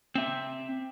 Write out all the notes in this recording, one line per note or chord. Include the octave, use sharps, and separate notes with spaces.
C4 E5